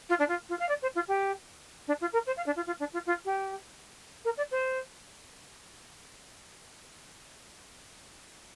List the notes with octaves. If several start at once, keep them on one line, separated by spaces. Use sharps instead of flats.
F4
D4
F4
F4
F5
D5
C5
F4
G4
D4
F4
A#4
C5
F5
D4
F4
F4
D4
F4
F4
G4
A#4
D5
C5